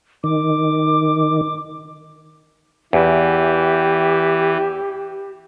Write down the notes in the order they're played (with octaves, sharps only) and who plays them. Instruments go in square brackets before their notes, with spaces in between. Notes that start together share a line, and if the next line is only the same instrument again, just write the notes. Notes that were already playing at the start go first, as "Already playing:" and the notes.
[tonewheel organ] D#3 [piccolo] D6
[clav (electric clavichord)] E2 [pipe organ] E3 [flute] G4